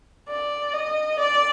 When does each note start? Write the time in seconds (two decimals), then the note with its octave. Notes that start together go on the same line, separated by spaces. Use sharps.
0.29 D5
0.73 D#5
1.19 D5